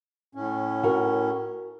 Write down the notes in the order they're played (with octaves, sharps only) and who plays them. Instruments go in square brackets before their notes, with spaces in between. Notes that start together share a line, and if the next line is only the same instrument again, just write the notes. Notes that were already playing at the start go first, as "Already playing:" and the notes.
[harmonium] A2 C#4
[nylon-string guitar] F#4 A#4